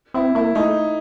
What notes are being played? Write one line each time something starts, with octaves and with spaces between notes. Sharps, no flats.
C4 E4
A#3 E4
A3 D#4